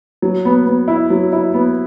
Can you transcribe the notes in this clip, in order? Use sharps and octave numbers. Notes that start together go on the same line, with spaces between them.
F#3
B3
B3
E4
F#3
E4
B3